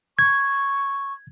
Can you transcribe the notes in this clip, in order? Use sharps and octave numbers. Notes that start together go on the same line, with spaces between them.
C#6 G#6